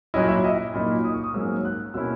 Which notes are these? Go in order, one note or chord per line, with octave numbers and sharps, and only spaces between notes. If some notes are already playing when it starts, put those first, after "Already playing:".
A#2 F#3 C#4 E4 D#5
E5
D#5
A#2 F#3 A#3 D#4 B5
D#6
C#6
D#6
G#2 F#3 A#3 C#4 E6
F#6
B2 A#3 C#4 E4 E6